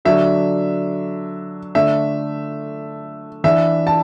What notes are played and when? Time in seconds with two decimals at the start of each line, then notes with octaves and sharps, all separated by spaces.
0.05 D3 F#3 D4 E5
1.75 D3 A3 D4 E5
3.44 E3 D4 E5
3.87 A5